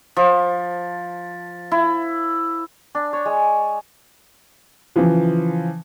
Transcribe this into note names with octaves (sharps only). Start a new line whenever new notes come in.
F3
E4
D4
C#5
G#3
C#3 E3 F3